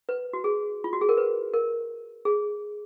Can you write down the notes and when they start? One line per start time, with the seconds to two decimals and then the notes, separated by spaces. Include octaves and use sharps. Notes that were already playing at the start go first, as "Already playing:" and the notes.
0.09 B4
0.33 F#4
0.44 G#4
0.84 F4
0.93 F#4
1.01 G#4
1.09 A#4
1.17 B4
1.54 A#4
2.25 G#4